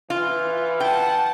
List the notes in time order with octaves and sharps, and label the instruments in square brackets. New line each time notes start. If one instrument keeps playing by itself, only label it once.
[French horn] E3 [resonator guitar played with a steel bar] F4
[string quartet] F#5 A5 [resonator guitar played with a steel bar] G5